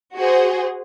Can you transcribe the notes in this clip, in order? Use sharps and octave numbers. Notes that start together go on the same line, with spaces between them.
F#4 G#4 C5